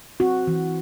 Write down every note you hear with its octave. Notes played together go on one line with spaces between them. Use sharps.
C4 F#4
E3